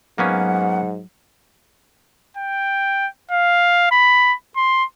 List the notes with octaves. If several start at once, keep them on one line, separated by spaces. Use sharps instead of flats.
G#2 F#3 A#3 B3 C#4 F#5
G5
F5
B5
C6